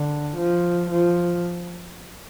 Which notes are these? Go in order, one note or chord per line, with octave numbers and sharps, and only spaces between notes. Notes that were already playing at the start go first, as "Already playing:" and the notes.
Already playing: D3
F3
F3